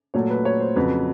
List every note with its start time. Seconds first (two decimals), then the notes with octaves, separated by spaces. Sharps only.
0.14 A#2 F#3 A3 C#5
0.30 B4
0.45 C#5
0.60 C5
0.76 F2 C#3 F#3 B4